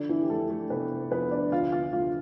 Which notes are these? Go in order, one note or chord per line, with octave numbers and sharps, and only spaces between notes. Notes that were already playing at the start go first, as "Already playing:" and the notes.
Already playing: D3 F3 D4
E3 E4
G4
F2 A3 A4
A3 A4
C3 B3 B4
F2 B3 B4
D4 D5
D2 F4 F5
F4 F5
D2 F4 F5